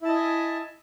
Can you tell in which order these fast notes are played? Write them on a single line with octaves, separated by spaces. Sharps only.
E4 A5 D#5 E5 G#5